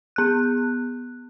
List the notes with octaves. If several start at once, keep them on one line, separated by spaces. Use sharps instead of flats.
B3 F#6